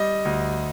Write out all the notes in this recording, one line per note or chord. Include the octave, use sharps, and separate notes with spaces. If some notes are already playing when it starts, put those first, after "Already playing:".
Already playing: G3 D#5
D2